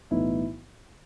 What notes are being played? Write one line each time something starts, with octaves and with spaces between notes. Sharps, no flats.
B1 A2 E3 B3 D#4 E4